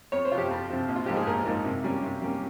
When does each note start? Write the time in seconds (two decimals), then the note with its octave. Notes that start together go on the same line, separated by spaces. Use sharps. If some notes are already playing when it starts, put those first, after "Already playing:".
0.12 F2 C#5
0.25 C5
0.31 C3 F4
0.35 F3 G4
0.51 F2
0.69 C3 F3
0.88 A#1
0.96 F4
1.06 G#2 F3 A#3 D#4 G4
1.17 G#4
1.27 A#1 A#4
1.46 G#2 F3 A#3 D#4
1.65 C3
1.84 G3 A#3 C#4
2.03 C3
2.22 G3 A#3 C#4